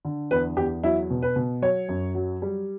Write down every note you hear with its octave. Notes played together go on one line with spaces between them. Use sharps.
D3
E2 B4
E2 G4
F#3 E4
B2
B4
B2
F#3 C#5
F#2
F#3
G3